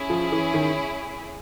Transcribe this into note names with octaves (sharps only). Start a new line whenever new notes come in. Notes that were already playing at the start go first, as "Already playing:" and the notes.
Already playing: C#4 E4 G#4
F3
E3
D#3